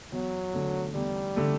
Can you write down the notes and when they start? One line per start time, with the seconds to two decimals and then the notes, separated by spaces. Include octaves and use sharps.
0.12 E2 F#3
0.54 D3 A3
0.95 E2 G3
1.36 D3 A3